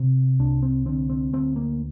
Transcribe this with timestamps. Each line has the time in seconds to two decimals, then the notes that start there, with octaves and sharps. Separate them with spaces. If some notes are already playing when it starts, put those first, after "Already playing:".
Already playing: C3
0.39 C2 D4
0.63 C4
0.85 D3 C4
1.09 C4
1.33 D2 C4
1.56 A#3